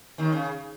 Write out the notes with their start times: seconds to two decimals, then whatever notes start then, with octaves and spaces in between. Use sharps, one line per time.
0.18 D#2 D#3
0.33 C#3